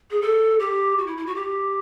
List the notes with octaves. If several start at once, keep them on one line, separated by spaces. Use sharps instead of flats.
G#4
A4
G4
F#4
E4
E4
F#4
G4